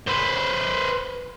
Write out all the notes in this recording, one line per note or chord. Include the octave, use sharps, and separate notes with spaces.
B4 C5